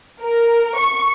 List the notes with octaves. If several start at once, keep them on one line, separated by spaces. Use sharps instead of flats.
A#4
C#6